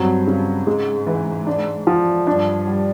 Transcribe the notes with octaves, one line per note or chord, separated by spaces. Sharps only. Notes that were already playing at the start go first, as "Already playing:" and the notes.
Already playing: G2 F#3 C4
C#3
G#2 G#3
E3
D4
F3
G2 D4
G3